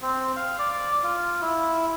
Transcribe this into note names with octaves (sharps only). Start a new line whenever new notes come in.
C4
F5
D5
F4
E4